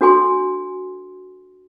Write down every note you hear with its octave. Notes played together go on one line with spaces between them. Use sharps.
D4 F#4 A4 G#5 C6